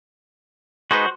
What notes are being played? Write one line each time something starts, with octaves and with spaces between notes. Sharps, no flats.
G#3 D#4 F#4 B4 C5